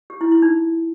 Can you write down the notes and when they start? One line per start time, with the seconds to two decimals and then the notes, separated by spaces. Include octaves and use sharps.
0.10 G4
0.21 E4
0.32 E4
0.42 D#4